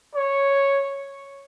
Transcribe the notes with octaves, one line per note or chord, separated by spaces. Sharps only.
C#5